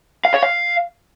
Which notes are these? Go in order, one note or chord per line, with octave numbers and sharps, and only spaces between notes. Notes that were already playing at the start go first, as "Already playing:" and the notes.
F5
C#5
F5